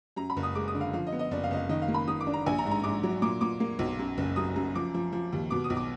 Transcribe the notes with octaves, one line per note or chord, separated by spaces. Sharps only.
F#2 A#5
B5
F#1
D#6
G#3 D6
D#6
D3
F5
F3 F5
D#5
B3
D#5
F#1 D5
F5
F#1 D#5
F5
D#3 D#5
F5
A#3
B5
D#3 D#6
D6
D4
A#5
A#1 G#5
A#5
G#2
A#5
G#2 D6
F#3
A#2 D6
A#2 D6
A#3
B1
F#2
F#1
F#2 D#6
F#2
F3 D6
F3
F3
D#2
B2 D6
D#6
B1
D6